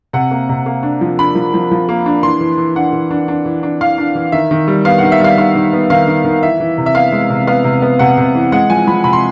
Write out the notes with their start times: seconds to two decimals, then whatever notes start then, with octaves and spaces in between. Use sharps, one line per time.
0.13 C3 F#5
0.31 A#3
0.49 C3
0.66 A#3
0.83 D4
1.01 F3
1.19 D4 B5
1.35 F3
1.54 F3
1.71 F3
1.89 A#3
2.06 D4
2.23 E3 C6
2.41 E3
2.58 E3
2.76 D4 F#5
2.93 E3
3.11 D4
3.28 D4
3.45 E3
3.63 D4
3.81 E3 F5
3.98 D4
4.15 E3
4.32 D#3 E5
4.51 D#3
4.68 G3
4.85 B3 F5
4.98 D#3 F#5
5.12 E5
5.20 G3 F5
5.38 D#3 F5
5.55 D#3
5.73 B3
5.90 D#3 F5
6.08 D#3
6.24 D#3
6.43 E3 E5
6.60 E3
6.78 C3
6.86 E5
6.95 B3 F5
7.12 G#3
7.30 C3
7.47 B3 F5
7.64 C3
7.82 B3
7.99 C3 F#5
8.17 C3
8.35 E3
8.52 G#3 F#5
8.70 F3 G#5
8.87 F3 B5
9.04 C3 B5
9.13 C6